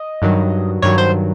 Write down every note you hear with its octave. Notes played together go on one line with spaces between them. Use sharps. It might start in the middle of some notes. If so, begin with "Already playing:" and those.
Already playing: D#5
G2 D#3 F#3
G2 D#3 F#3 C#5
C5